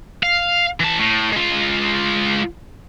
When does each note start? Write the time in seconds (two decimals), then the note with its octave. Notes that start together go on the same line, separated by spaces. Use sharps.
0.23 F5
0.80 E3 A5
0.99 A2
1.32 G#3 F4